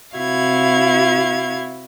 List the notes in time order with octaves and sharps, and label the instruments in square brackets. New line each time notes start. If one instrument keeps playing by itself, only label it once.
[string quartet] C3 E4 F#4 F5 G#6